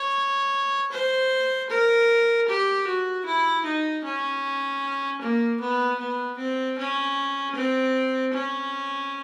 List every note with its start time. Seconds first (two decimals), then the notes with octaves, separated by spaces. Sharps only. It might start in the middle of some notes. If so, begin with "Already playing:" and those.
Already playing: C#5
0.92 C5
1.70 A#4
2.48 G4
2.87 F#4
3.26 E4
3.65 D#4
4.04 C#4
5.22 A#3
5.61 B3
5.99 B3
6.38 C4
6.78 C#4
7.55 C4
8.34 C#4